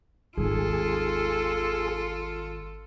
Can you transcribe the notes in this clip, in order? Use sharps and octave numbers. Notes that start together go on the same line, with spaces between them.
G#1 D#2 F4 G#4 A4